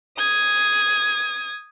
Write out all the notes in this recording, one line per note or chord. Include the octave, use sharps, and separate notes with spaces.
D#6 G#6